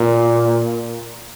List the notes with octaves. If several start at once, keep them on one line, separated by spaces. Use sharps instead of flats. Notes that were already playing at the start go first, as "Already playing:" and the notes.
Already playing: A#2